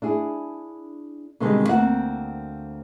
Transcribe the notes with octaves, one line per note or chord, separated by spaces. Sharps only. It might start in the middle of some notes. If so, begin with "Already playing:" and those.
D4 E4 G#4
B2 D3 D#3 G3 G#3 C4
D2 A#3 C4 F#5